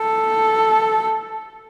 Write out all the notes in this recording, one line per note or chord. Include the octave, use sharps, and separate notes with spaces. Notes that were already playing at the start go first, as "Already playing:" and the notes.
Already playing: A4